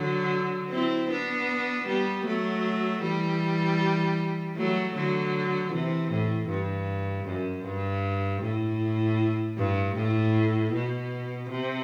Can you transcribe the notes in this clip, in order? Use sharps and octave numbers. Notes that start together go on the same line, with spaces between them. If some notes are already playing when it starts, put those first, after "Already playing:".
Already playing: D3 F#3
C4 E4
B3 D4
G3 B3
F#3 A3
E3 G3
F#3 A3
D3 F#3
C3 E3
A2
G2
F#2
G2
A2
G2
A2
B2
C3